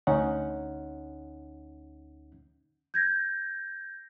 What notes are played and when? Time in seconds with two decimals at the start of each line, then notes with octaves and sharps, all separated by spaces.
0.07 D2 C#4 D#4 F#5
2.94 G6 G#6 A#6